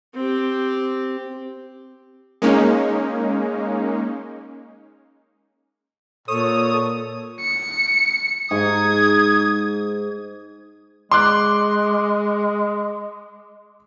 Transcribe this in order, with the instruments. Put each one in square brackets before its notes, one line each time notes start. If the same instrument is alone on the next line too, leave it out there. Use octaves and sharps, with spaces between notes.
[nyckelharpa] C4 G4
[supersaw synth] G#3 A#3 C#4 D#4
[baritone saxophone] A#2 [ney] A4 [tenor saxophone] C#5 [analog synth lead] D#6
[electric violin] C#7
[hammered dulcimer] G#2 [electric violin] D#6 G#6
[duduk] G#3 [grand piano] C6 D6 F#6